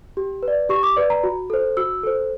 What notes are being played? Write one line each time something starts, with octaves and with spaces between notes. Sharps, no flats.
G4
B4
D5
G4 C#6
D6
B4 D5
A#5
F#4
A4 C5
F#4 E6
A4 C5